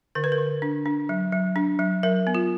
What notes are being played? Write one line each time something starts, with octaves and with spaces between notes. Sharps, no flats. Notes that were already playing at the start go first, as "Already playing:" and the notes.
D3 A#4
B4
A#4
D3
D4
D4
F#3
F#3
D4
F#3
F#3 A#4
B3
F4